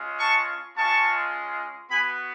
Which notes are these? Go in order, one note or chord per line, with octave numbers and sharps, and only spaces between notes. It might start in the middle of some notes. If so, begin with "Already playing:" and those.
Already playing: G#3 C#4 F4
A5 C#6
G#3 C#4 F4 A5 C#6
B3 F#4 G#5 B5